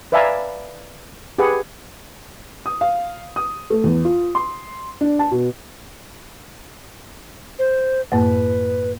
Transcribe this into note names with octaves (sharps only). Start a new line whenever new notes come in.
B4 D5 E5 F5 G#5 A#5
G4 G#4 B4 F#5
D#6
F5
D#6
A3
E2
F4
C6
D4
A5
B2
C5
F#2 A2 A#3 B4